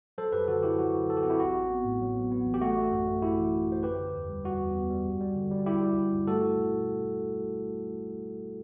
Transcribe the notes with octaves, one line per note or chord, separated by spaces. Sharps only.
F#3 A4 C5
F#2 G4 B4
D3 F#4 A4
F#3 E4 G4
F#3 F#4
D3
F#3 A4
G4
C4 F#4
E4 G4
A1 F#4
A1
B3
A2
F#3
B3
B3
A1
G4
A3 F#4
A3
F#2
A3
A3 E4 G4
E3
G1
F#2 C5
D3 G4 B4
D3
E2
G3
G3 F#4
E2
B3
G3
G1
G3
D3
G3
G3 E4 G4
G3
G3
G1
A3 F#4 A4
E4
B2